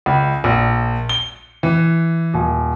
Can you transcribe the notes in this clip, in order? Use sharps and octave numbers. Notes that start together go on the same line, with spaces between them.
C#2
A#1
G7
E3
D#1